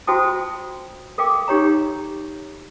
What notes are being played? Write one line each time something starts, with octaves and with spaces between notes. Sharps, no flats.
F4 F#4 C5 G5 A5 D#6
A4 A#4 F5 G5 D6
D#4 G4 C#5 A#5